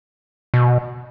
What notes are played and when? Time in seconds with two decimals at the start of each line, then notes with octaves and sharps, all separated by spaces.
0.54 B2